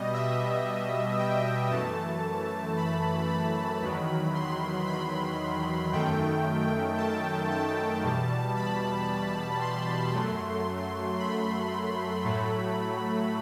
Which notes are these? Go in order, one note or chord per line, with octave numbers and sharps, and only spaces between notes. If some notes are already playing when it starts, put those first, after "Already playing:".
Already playing: B2 G3 D#5
E5
G5
F#2 E3 A3 A5
B5
B5
E2 D#3 F#3
C6
B5
F#2 D#3 A3 G5
A5
A5
E2 B2 G3
B5
C6
F#2 F#3 A3
B5
A2 F#3 A3